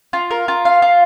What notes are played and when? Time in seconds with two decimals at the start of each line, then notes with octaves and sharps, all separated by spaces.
0.13 F4
0.31 A#4
0.48 F4
0.65 F5
0.82 F4